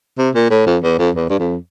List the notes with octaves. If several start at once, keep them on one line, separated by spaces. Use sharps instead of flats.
C3
A#2
A2
F2
E2
F2
E2
G2
F2